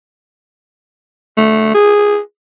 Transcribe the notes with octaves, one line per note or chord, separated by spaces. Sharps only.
A3
G#4